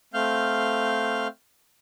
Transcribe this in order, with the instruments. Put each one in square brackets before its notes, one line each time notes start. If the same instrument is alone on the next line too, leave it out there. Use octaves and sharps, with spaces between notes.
[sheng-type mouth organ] A3 C4 F5 F6 G6